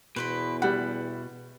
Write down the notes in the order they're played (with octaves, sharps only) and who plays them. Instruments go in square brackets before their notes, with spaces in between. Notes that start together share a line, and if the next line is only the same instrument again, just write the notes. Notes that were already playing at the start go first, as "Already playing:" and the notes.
[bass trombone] E2 [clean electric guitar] B2 [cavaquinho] B4 C5 B5
[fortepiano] G3 F#5 [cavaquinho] E4